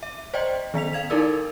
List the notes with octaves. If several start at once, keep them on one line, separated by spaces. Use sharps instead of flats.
E5
C5 D5 D#5 G5
D#3 B3 B6 F7
F5 G#6 F7
D#4 E4 A4 A#4 D5 E6